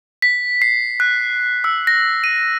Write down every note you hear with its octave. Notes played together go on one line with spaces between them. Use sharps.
B6
C7
F#6
E6
A#6
D#7